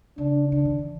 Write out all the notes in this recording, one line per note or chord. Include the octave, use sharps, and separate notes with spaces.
C#3 D4
D3 D4
D#3
E3